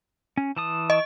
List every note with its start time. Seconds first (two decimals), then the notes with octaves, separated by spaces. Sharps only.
0.37 C#4
0.57 E3 A5 D#6
0.90 D#5